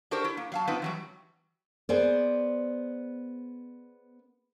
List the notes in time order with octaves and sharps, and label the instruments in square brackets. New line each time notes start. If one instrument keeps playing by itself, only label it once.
[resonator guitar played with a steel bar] D4 F#4 G4 A4 A#4 C5
E4
A#3
F#3 F5 A5
B3 C4 D#4 F4 B4
E3 F#3 G3
[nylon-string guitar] B3 G#4 C5 D5